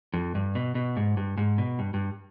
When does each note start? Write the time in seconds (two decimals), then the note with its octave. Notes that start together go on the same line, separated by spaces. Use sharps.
0.14 F2
0.35 G2
0.55 B2
0.75 B2
0.97 G#2
1.17 G2
1.38 G#2
1.58 B2
1.79 G2
1.94 G2